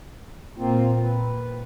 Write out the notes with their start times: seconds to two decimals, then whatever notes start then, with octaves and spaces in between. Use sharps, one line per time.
0.58 A#2 A#3 C4 F4
1.01 B4